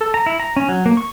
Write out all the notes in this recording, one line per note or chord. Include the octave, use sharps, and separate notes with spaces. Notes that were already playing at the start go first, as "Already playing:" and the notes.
A4
A#5
E4
A#5
C#4
F#3
A#3
C#6